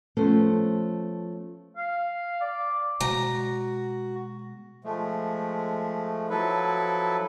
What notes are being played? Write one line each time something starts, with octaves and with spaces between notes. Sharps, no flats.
F3 A3 B3 C#4 C5
F5
D5
B2 G#3 F#4 A#5
F3 G#3 A3
F3 F#3 E4 A4 B4